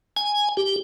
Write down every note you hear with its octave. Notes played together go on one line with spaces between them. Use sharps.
G#5
G4